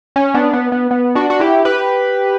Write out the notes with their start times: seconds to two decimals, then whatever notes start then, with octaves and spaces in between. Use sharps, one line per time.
0.16 C#4
0.34 B3 D4
0.53 B3
0.72 B3
0.91 B3
1.15 D4 F#4
1.30 F#4
1.40 E4 G4
1.65 G4 B4